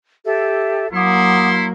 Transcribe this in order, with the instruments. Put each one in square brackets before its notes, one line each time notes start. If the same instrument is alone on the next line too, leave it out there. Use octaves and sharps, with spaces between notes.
[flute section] G4 A4 E5
[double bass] F#3 A#3 [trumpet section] E4 C6 [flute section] F#5 D6 D#6